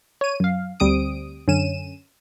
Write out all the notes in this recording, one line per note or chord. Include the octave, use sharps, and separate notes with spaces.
C#5 D#7
F#2 F5
D2 G3 C4 D#6 D7
F#2 D3 C#4 D#7 E7